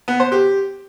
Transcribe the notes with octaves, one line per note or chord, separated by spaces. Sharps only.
B3
C5
G4